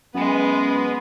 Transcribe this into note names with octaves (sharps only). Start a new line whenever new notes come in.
F#2 G#3 B3 B4